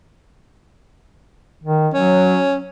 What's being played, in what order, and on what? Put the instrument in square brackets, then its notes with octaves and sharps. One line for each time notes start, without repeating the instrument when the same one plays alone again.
[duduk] D#3
[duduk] F#3 [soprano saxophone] C#4